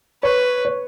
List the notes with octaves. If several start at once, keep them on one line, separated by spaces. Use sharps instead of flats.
B4 C#5
C#5